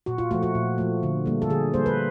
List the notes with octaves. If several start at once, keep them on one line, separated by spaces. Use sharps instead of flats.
A#2 F#4
F4
F3 A3 F#4
F#4
A#2
F3 A3
D3
G3 A#3
A4
D3 G#4
G3 A#3 C5
B4